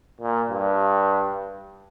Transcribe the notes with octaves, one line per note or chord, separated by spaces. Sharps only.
A#2
G2